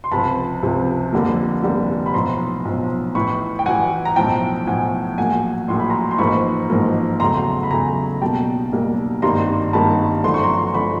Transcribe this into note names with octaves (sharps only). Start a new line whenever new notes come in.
C6
C#2 C3 F3 A5 B5
C#2 C3 F3
F1 F2 D3 G3 A#3
F1 F2 D3 G3 A#3
B5
B1 A2 F3 A#5 C6
B1 A2 F3
A1 A2 E3 B5 C#6
G5
A1 A2 E3 F#5 G#5
A#5
B1 A2 F3 G5 A5
B1 A2 F3 F#5 G#5
A#1 A2 F#3 A#3 F#5 G#5
A#1 A2 F#3 A#3 C6
B5
A#5 C6
C6
A1 G#2 F3 A#3 B5 C#6
A1 G#2 F3 A#3
E2 C#3 F#3 A3 A#5 C6
B5
E2 C#3 F#3 A3 G#5 A#5
B1 B2 G3 A#3 G5 A5
B1 B2 G3 A#3
G#1 G2 D#3 G3 A#3 A#5 C6
G#1 G2 D#3 G3 A#3 A5 B5
G1 F#2 D3 F3 A3 C6
C#6
A#5 C6
G1 D3 F3 A3 B5 C#6